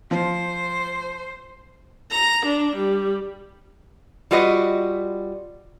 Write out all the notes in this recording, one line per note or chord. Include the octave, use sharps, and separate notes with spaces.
F3 C5
A#5
D4
G3
G3 F4 F#4 B4 D#5